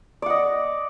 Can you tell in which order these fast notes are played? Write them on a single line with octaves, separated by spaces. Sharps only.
D5 F#5 D#5